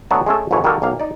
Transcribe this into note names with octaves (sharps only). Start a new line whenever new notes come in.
D2 F#3 B3 D#5 A5
G#3 A3 C#4 A4
G#1 F2 G#2 E3 C#5 A5
D#3 G3 A#3 F#4 A4 A#4
B1 A#3 F5
D#4 D5